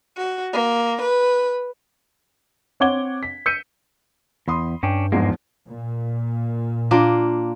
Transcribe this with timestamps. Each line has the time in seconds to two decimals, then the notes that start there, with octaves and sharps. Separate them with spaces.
0.17 F#4
0.53 A#3
1.02 B4
2.80 C4 C#5 F#5 D6 G#6 G7
3.23 B6
3.46 E6 G6 B6 C#7 D#7
4.48 E2 B5 C6 D#6
4.83 G2 C#4 D4 G5
5.12 E2 G#2 F3 G#3 A#3
5.67 A#2
6.91 A#3 D4 F4